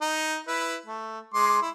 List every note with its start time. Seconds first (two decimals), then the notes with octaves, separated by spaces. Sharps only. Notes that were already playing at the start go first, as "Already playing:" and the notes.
0.01 D#4
0.47 E4 B4
0.86 A3
1.34 G#3 C6 D6
1.61 E4